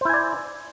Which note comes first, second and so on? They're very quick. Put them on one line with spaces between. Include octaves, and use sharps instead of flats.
C5 E4 G#5 D5